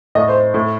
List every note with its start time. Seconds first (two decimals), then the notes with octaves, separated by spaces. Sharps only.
0.15 A2 D#5
0.28 C5
0.54 A2